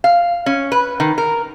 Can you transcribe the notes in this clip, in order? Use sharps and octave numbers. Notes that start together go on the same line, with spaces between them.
F5
C#4
B4
D#3
A#4